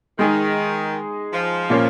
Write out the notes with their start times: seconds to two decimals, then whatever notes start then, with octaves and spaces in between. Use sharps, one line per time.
0.19 D#3 G#3 D#4 G#4
1.33 F3
1.70 A#2 A#3 C#4